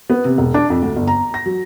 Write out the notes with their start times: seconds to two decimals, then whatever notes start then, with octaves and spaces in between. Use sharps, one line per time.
0.10 B3
0.25 C3
0.38 E1
0.54 D4
0.70 F2
0.83 D2
0.96 G1
1.07 A#5
1.34 A#6
1.46 F#3